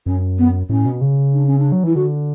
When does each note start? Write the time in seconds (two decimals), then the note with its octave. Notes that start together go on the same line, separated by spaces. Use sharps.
0.06 F#2 C#4
0.38 B3
0.69 A2 C#4
0.86 B2
1.01 C#3
1.33 D4
1.46 C#4
1.58 D4
1.72 F#3
1.84 E3 E4
1.95 D3 F#4